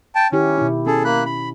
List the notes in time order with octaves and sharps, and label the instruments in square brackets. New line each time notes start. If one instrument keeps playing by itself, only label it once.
[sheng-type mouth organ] G5 A5
[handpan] D#3 E4 G4 [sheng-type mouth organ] C#4
[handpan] B2 E4
[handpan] C#4 [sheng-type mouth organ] G#4 A4
[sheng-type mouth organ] A#3 B5 F#6
B5